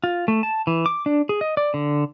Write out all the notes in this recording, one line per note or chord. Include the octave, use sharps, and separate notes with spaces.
F4
A3
A5
E3
D6
D4
G#4
D#5
D5
D3